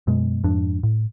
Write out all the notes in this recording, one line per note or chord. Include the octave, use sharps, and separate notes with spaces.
F#2 B2 G#3
F2 G#2 D4
A2